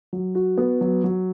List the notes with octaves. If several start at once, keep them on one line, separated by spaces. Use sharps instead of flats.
F#3
F#4
B3
F#3
F#3